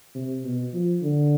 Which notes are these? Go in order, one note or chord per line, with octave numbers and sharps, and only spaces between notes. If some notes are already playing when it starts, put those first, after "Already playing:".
C3
B2
F3
D3